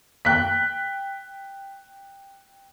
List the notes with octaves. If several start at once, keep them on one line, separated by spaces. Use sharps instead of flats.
G5 F#6 B6